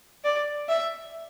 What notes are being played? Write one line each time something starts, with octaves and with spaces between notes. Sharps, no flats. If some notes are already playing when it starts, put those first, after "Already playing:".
D5
E5